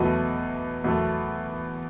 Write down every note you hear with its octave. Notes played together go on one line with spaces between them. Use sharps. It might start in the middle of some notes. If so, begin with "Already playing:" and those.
Already playing: E2 B2 F#3 A3 D#5
E2 B2 F#3 A3